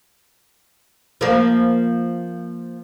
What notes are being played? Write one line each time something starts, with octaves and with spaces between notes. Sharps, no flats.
F3 A#3